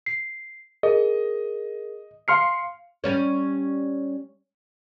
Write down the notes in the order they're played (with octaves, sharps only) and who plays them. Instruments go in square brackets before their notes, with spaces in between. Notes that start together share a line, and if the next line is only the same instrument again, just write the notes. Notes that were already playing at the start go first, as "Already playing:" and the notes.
[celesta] C7
[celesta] G#4 A#4 [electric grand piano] D#5
[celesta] F5 C7 [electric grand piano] C6 F6 C#7
[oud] G3 C#4 C#5